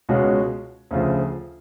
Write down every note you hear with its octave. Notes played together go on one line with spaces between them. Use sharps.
C#2 B2 G#3 C#4 F#4
D2 C#3 F3